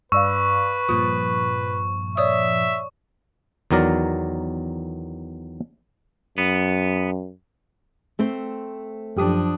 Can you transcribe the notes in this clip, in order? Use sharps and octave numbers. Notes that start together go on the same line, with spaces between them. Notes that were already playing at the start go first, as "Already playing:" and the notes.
G2 B4 D5 F5 C#6 E6
G2 A#2 F3 D#6
C#5 D5 E5 D#6
E2 D#3 F#3 A#4 D5
F#2 B3
A3 C4 C5
F#2 F3 D4 G4 D#6